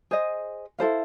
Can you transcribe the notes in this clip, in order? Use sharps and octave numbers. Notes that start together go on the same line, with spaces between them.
G#4 C5 D#5
E4 A4 C5 F5